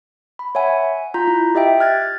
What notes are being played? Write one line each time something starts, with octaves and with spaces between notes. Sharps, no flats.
B5
C#5 E5 F#5 G#5
F4 A#5 G6
E4
G4 D#5 E5 G5
F6 F#6 G#6 A6